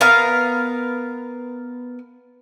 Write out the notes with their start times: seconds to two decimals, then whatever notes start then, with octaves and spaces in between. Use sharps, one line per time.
0.01 B3 A#4 F5